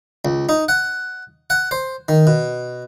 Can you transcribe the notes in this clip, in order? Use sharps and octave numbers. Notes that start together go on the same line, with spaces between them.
C#2
D#4
F#5
F#5
C5
D#3
B2